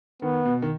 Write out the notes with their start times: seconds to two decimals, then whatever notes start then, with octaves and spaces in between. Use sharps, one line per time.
0.22 D#3 B3
0.45 B2
0.62 D#3